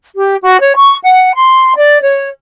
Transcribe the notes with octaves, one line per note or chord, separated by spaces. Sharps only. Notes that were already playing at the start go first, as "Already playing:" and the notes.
G4
F#4
C#5
C#6
F#5
C6
D5
C#5